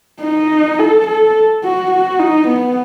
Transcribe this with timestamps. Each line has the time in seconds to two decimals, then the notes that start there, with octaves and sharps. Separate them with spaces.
0.22 D#4
0.79 A4
1.07 A4
1.64 F#4
1.91 F#4
2.19 D#4
2.48 B3